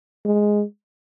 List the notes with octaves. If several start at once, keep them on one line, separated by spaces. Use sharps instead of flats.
G#3